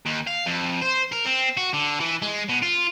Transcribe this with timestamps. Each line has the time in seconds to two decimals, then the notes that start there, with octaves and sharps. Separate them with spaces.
0.06 D#2
0.27 F5
0.46 F2
0.82 C5
1.13 A#4
1.26 C4
1.57 F#4
1.74 D3
2.00 E3
2.22 G#3
2.49 B2
2.62 F4